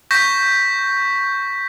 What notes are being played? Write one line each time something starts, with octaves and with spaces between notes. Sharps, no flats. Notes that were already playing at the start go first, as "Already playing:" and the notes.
C#6 G6 A#6 B6